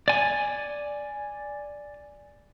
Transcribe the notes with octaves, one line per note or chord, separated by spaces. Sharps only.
D5 G#5